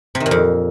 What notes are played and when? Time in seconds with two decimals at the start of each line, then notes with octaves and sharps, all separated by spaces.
0.15 C3
0.20 D#3
0.26 A#2
0.31 F2